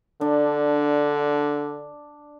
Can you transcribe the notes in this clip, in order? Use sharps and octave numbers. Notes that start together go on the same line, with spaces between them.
D3 D4